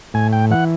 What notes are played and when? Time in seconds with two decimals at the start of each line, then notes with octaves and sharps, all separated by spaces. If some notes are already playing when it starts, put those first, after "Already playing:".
0.14 A2 G#5
0.33 G5
0.51 E3 F#5